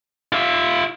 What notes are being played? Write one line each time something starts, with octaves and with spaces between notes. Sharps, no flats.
F4 E5